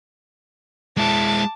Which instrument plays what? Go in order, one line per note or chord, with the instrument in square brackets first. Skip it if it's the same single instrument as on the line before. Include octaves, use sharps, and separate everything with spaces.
[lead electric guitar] G#3 E4 [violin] A5 D6